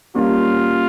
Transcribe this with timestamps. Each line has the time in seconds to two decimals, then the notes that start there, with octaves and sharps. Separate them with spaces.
0.15 G3 A#3 C#4 F4